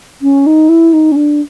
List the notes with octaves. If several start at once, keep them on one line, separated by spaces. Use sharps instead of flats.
C#4
D#4
E4
D#4
C#4
D4